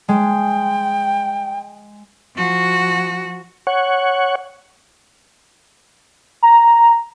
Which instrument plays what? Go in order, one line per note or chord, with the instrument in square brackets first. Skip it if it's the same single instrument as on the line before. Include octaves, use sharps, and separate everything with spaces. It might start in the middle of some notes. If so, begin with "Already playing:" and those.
[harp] G#3 [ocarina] G5
[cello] F3 F#4
[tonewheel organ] C#5 F#5
[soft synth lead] A#5